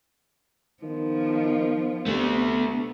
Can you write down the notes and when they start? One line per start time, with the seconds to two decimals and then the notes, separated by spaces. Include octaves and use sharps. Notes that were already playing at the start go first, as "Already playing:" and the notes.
0.83 D#3 F3 B3
2.06 C3 A3 B3 D4